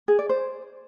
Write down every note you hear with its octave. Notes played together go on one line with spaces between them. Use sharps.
G#4
D5
C5